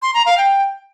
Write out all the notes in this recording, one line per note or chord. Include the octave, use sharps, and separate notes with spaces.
C6
A#5
F5
G5